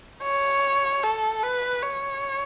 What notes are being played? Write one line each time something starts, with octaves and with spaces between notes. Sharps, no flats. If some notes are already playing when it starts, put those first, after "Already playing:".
C#5
A4
B4
C#5